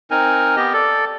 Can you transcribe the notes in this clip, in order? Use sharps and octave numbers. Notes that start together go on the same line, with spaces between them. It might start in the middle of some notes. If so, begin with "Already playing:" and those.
C4 D#4 A#4 G#5
B3 G4 D#5
A4 D5